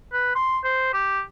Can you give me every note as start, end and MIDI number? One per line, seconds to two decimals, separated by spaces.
0.13 0.33 71
0.35 0.59 84
0.64 0.91 72
0.93 1.22 67